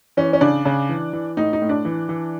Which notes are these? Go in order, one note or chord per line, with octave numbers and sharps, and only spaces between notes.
E3 C#4
C#4
C#3 D4
C#3
E3
E3
A2 D#4
D#4
A2
D4
E3
E3